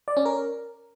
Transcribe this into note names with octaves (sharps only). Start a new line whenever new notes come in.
D5
C#4
A#4